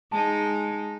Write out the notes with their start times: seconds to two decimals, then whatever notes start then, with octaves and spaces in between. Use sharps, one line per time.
0.12 G#3 D#4 A5